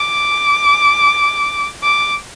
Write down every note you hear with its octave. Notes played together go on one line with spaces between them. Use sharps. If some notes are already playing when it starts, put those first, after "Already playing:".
Already playing: D6
D6